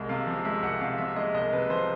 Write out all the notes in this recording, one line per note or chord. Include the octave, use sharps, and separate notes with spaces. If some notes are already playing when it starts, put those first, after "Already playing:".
Already playing: C2 G#3
C3 F5
F3
G#3 E5
C2 F#5
C3 F5
F3 E5
G#3 D#5
C2 D#5
C3 B4
F3 C5